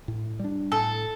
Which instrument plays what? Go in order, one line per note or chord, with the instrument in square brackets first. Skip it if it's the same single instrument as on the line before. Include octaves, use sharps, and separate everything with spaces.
[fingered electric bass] A2
G3 D4
[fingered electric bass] A2 [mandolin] A4